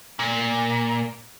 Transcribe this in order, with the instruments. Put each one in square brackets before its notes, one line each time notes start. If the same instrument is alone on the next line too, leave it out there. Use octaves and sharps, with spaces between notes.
[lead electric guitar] A#2